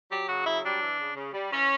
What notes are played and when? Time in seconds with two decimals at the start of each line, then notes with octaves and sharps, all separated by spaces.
0.10 F#3 G4
0.28 C#3 F#4
0.46 F#3 E4
0.63 G3 D4
0.81 E3
0.98 C#3
1.16 C#3
1.33 G3
1.51 E3 C#4